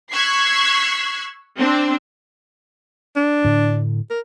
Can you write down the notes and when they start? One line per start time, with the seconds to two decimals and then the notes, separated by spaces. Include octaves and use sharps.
0.12 C#6 E6 F#6 G#6 B6 C7
1.58 C4 D4
3.16 D4
3.45 A2 D3
4.10 A#4